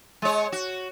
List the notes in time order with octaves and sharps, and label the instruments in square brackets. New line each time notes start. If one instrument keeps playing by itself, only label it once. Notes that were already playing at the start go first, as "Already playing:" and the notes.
[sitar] G#3 C#5
F#4